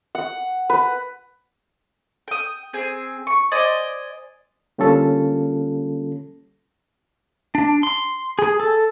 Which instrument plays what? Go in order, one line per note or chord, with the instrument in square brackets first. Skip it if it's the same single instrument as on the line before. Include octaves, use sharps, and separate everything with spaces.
[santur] F#5
B4
[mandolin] G5 D#6
C4 G#4 G#5
C#6
C5 D5 D#5 G#5
[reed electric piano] D3 G3 A#3 C#4 F4 A4
[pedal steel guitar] D4
C6
G#4
A4